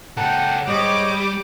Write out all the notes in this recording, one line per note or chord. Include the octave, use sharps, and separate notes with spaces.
C#2 A4 F#5 G5
G#2 G3 C#5 D#5 D6